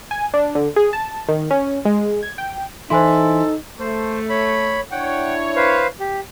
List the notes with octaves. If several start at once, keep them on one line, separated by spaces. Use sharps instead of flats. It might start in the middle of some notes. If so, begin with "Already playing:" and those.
G#5
D4
D3
G#4
A5
D#3
C#4
G#3
G#6
G5
E3 D#4 E4 A4 C5 G#5 C6
A3 C5
C#5 B5
D4 E4 C#5 F#5 G5
B4 C5 F5
G4